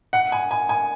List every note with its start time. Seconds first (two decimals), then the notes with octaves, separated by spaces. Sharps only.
0.13 F#5
0.32 G#5
0.51 G#5
0.69 G#5